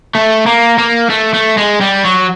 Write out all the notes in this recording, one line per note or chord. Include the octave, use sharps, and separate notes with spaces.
A3
A#3
A#3
A3
A3
G#3
G3
F#3